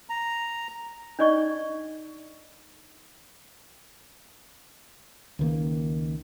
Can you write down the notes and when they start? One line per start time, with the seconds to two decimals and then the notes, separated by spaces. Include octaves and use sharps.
0.09 A#5
1.19 D4 D#4 D5 D#5 C#6
5.39 C#2 D#3 A#3